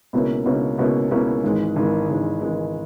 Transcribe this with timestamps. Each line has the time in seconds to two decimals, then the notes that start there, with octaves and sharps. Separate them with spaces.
0.13 C#2 B2 A#3 C#4 E4
0.46 C#2 B2 A#3 C#4 E4
0.78 C#2 B2 A#3 C#4 E4
1.11 C#2 B2 A#3 C#4 E4
1.44 G#1 G#2 E3 G#3
1.76 G#1 G#2 E3 G#3
2.09 G#1 G#2 E3 G#3
2.41 G#1 G#2 E3 G#3